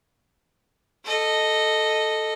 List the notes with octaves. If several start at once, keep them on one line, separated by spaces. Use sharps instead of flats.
A4 D#5